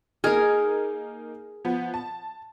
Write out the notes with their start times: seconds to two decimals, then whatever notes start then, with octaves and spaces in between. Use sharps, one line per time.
0.24 A#3 D#4 G#4 A#4 F6
1.65 F3 B3
1.94 A5